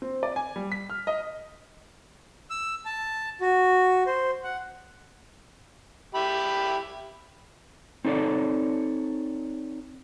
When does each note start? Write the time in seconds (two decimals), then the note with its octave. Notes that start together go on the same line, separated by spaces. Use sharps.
0.02 C4
0.23 D5
0.36 G#5
0.56 G3
0.72 B6
0.90 F6
1.07 D#5
2.50 E6
2.85 A5
3.41 F#4
4.07 C5
4.44 F#5
6.15 G4 E5 B5
8.05 C4 D#4 A4 C#5 D5